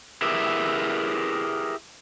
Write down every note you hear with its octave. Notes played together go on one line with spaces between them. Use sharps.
E4 G4 G#4 A#4 B4 E5